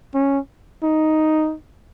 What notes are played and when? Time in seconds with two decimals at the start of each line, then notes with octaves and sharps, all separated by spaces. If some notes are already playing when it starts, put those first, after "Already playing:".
0.15 C#4
0.83 D#4